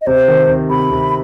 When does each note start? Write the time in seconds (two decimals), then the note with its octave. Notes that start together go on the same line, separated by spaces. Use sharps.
0.01 D#5
0.07 C3 C5
0.28 D#3
0.48 C3
0.70 C3 B5
0.91 C3